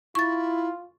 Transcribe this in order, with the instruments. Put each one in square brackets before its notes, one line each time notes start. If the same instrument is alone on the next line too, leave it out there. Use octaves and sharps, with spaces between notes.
[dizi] E4 [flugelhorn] F4 [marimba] C#6 A6